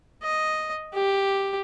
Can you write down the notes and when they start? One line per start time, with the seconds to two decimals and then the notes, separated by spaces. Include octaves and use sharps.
0.23 D#5
0.94 G4